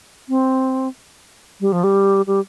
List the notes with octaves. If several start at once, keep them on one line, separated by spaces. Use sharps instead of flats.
C4
G3
F3
G3
G3